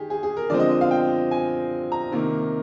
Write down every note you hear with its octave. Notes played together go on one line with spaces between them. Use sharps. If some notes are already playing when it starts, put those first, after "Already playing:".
Already playing: D#3 G4 G#4
G#4
G#4
A#4
D3 F3 G#3 C4 D5
D#5
D#5
F5
G5
G#5
A#5
C3 D#3 A#3